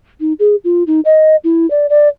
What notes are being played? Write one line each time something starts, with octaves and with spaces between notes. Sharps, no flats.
D#4
G#4
F4
D#4
D#5
E4
D5
D5